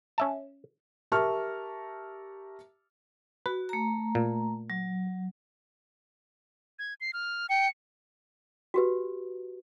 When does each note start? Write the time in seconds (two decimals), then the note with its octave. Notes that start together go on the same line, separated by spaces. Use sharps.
0.18 C#4 E5 A5
1.12 G4 A#4 E5 A5 C#6 F6
3.46 F#4 B4
3.69 A3 A#5
4.15 A#2
4.70 F#3
6.79 G#6
7.01 C7
7.13 F6
7.49 G5 C#7
8.74 F#4 G4 B4